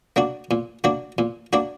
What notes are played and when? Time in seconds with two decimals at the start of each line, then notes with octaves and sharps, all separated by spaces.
0.16 A#3 D4 F#4
0.51 A#2
0.84 A#3 D4 F#4
1.18 A#2
1.53 A#3 D4 F#4